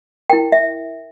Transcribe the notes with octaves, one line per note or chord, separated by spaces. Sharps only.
E4 A#4 G5
E5